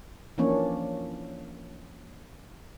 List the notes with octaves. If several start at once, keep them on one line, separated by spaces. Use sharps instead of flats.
E3 F3 A#3 C#4 D4 C#5